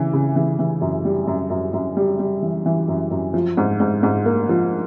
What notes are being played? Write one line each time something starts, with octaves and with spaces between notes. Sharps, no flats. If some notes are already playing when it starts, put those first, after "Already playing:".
Already playing: C#3 E3
C#3
E3
E3
F#2
G3
F#2
F#2
F#2
G3
G3
E3
E3
F#2
F#2
F3
G#2
G#2
G#2
A#3
F3